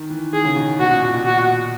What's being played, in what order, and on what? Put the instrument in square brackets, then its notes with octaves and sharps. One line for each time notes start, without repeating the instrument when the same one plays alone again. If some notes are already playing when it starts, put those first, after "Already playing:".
Already playing: [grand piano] D#3
E3
[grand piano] D#3 [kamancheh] G#4
[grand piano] C#3
B2
[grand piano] B2 [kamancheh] F#4
[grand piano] A#2
A#2
B2
[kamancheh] F#4